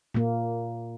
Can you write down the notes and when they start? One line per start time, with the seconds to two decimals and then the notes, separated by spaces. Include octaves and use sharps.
0.14 A#2 A#3